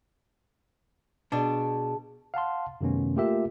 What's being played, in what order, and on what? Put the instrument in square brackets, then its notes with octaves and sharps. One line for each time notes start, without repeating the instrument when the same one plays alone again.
[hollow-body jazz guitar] B2 D4 [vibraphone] G#4 A5
[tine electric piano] F5 F#5 A5 C6
F#2 C3 D#3 A3 B3 C#4
A3 A#3 F4 G4 A#4 E5